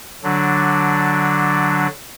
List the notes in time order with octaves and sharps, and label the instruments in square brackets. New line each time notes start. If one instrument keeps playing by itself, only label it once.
[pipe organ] D3 F#3 D4